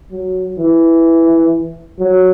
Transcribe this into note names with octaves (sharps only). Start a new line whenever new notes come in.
F#3
E3
F#3